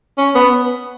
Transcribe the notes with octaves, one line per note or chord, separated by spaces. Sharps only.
C#4
B3